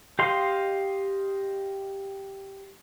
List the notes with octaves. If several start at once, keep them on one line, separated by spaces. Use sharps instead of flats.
G4 D#5 F5 C6